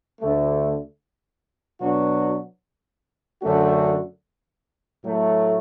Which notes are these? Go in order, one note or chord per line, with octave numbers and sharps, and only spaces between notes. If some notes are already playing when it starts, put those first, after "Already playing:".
D2 D3 A3
B2 F#3 D4 F#4
F#2 D3 A3 D4 F#4
A2 F#3 A3